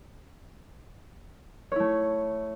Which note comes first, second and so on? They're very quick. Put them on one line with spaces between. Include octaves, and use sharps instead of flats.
C#5 E4 A3